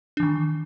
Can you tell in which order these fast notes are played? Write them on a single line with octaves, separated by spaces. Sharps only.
D4 E3 D#3